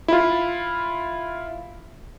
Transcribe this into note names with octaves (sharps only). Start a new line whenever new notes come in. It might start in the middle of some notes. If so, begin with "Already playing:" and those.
E4 F4